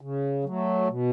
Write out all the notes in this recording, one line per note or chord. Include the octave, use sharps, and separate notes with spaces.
C#3
F#3 A3
B2